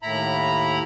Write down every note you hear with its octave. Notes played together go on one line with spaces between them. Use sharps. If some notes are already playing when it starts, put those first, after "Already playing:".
D#2 A2 E4 A#5 B5